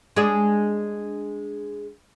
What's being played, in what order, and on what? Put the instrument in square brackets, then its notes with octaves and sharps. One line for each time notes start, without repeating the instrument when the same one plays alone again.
[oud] G#3 D4 G#4